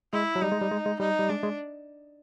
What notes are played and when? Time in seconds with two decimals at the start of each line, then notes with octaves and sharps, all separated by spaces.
0.13 G#3 E4
0.35 F#3
0.42 G3 D#4
0.52 G#3
0.62 G3
0.71 G#3
0.86 G#3
1.00 G3 D#4
1.19 G3
1.29 G#3 D4
1.43 G#3